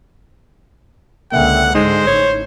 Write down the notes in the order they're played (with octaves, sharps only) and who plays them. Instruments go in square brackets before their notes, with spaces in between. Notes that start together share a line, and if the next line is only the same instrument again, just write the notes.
[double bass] C#2 D3 [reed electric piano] A#3 E5 G5 [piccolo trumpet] F#5
[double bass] G#2 D3 [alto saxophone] G#3 [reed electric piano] D#4 [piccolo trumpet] C5
[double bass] A1 [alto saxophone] C#5